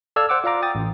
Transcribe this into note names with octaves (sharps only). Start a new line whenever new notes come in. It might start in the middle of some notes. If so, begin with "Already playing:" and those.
A4 D5 F5 E6 F6 G#6
C5 F#5 D6 E6
F4 D5 F5 A#5 D6
G5 D#6 A6
A1